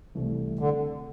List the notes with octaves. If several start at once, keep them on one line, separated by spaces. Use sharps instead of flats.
C2 C3 E3 A3
D3